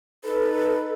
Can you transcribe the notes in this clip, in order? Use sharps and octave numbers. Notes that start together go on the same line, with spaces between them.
D#4 A4 B4